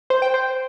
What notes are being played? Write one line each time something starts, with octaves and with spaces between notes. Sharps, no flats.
C5
G5
C5